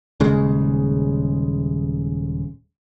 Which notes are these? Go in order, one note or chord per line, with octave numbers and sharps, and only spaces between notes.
D#1 C#3 G#3